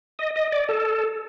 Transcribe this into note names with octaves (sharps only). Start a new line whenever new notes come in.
D#5
D#5
D5
A4